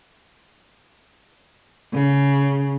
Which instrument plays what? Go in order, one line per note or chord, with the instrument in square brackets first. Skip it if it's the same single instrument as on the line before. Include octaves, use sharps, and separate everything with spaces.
[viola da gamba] C#3